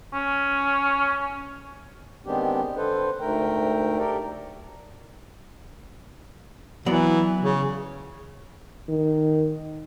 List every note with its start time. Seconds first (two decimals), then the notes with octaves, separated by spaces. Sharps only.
0.13 C#4
2.26 D#3 G#3 B3 C4 D4 G4
2.77 D3 A4 B4 C5
3.20 D2 G#2 A3 A#4 G5
3.98 G4 A4 A#4 D5
6.86 E3 F#3 B3 D5
7.41 C#3
8.89 D#3